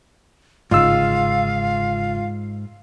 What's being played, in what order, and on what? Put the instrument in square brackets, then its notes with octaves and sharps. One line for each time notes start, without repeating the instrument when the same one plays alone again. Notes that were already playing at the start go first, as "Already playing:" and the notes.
[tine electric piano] G1 C#3 [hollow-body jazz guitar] G#2 [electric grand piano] F4 E6 [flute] F5